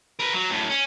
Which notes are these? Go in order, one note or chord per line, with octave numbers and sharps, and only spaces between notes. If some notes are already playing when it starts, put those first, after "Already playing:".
A#4 B4
F#3
F#2 A2
C#4